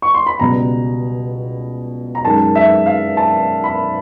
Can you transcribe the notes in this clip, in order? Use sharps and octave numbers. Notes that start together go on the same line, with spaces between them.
C#6
C6
B5
C#2 B2 G3 A#5
A#5
F#2 D#3 G#3 A5
E5
F5
A5
B5